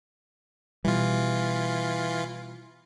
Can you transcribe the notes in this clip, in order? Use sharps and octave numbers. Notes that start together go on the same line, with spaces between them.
B2 E3 G3 F4